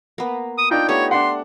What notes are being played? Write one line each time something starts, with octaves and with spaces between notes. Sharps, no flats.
A#3 B3
D#6
D4 D#4 F4 G5
A3 B3 G4 C#5
D4 F#5 C6